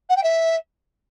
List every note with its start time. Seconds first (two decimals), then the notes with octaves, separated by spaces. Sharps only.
0.09 F#5
0.16 G5
0.23 E5